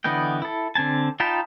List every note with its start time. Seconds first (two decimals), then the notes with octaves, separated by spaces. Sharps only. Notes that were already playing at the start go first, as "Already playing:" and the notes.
0.04 D3 E3 B3 D#5 G5
0.42 E4 A4
0.75 D3 C4 G#5 A5
1.20 D#4 F4 G5 A5 B5